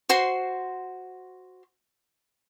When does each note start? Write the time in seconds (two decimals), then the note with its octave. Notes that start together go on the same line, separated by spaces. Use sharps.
0.09 F#4 C5 C6